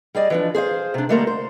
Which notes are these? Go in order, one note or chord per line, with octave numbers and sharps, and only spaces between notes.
G3 G#4 D5 D#5
E3 F3 D4
G#4 C5 C#5 F5
C3 D4
D3 G3 A3 A#3 A#4 C5
C5